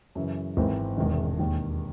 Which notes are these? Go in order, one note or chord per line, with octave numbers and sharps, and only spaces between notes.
F#2 C#3 E3
G#1 G#2 E3 C4
E1 E2 C3 D#3
E1 D#2 D#3